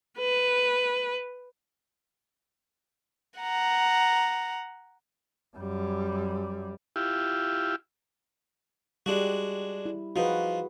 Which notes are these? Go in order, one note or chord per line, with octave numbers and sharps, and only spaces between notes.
B4
F#5 A#5
F#2 G3
E4 F4 G4
G3 G#3 D4 F#4 G4
E4
F3 D#4 F#4 G#4 B4